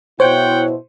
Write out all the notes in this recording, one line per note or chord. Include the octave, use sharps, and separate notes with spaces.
B2 E4 C5 C#5 F#5 G5